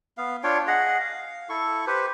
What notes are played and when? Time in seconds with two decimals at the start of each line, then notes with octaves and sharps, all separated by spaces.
0.18 B3 F5
0.43 D4 F4 C#5 G5
0.67 G#4 D#5 F#5
1.00 F5
1.49 E4 A4 C#6
1.87 G4 B4 C5